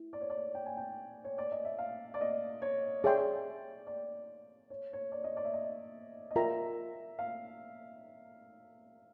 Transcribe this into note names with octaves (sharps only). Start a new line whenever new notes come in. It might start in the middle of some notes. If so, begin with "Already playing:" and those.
Already playing: E4
D5
C#5
D5
G5
G#5
G5
C#5
D5
D#5
E5
F5
D5
D#5
C#5
G#4 C#5 D5 E5 G5 C6
D5
C#5
C#5
D5
D#5
D5
E5
D#5
D#5
F4 A#4 D5 E5 G5 A#5
F5